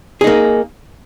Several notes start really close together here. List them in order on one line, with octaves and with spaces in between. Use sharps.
G#4 D#4 A#3